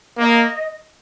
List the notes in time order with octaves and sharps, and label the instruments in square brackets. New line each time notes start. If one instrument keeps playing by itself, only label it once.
[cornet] A#3 [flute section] D#5